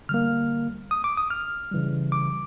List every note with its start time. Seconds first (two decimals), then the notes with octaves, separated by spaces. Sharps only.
0.09 D3 G3 A#3 F6
0.91 D#6
1.04 D6
1.17 D#6
1.31 F6
1.71 C#3 E3 G3
2.12 D6